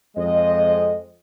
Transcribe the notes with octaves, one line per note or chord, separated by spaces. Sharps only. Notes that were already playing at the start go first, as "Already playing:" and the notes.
F2 G#3 D#5